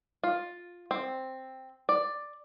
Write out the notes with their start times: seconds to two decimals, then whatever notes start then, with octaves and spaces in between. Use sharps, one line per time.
0.24 F4
0.91 C4
1.89 D5